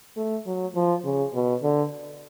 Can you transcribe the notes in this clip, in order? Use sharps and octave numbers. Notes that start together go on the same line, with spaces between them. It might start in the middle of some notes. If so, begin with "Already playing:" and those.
A3
F#3
F3
C#3
B2
D3